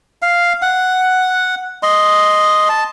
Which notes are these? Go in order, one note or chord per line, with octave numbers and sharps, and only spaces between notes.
F5
F#5
D#5 C6
A5